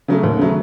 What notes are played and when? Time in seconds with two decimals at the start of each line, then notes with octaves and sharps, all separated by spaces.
0.08 C#3 F#3 A3
0.23 D#2
0.39 C#3 F#3 A3